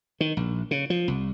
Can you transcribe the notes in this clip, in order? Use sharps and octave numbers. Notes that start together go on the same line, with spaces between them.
D#3
A#1
C#3
F3
C2